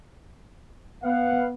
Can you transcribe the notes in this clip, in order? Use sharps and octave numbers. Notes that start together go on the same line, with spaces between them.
B3 B4 F5 F#5